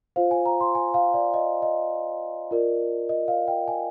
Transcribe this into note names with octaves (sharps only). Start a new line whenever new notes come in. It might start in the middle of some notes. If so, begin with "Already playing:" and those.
F4 C5 F5
G#5
A#5
C6
G#5
F5
D5
D#5
D#5
F4 A#4 D5
D#5
F5
G5
G#5